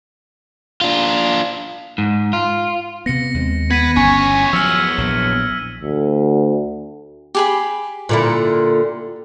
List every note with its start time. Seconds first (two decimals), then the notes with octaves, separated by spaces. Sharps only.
0.81 D4 F4
1.98 G#2
2.33 F4
3.06 C3 B3 A#6 C#7
3.34 D#2 G#3 C4
3.71 B3 B4 G#6 B6 D#7
3.97 G1 E2 C#4 C#5 G#5
4.53 F3 F#3 E6 F6 C#7
4.98 A#1 F#3
5.81 D2
7.35 G4 G#4 B5
8.09 A#2 D3 E4